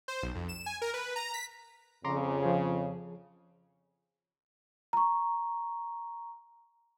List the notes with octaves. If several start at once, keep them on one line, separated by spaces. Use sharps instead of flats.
C5
B1
F2
E7
G#5
A#4
B4
A#5
B6
F2 C#3 A#5 C6 D6
F3 G#4
A#5 C#6